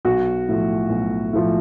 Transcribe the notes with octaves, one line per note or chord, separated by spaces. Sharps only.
B1 F#4
A2 F3
B1
A2 F3